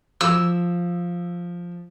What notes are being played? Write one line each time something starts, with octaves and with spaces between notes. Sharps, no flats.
F3 E6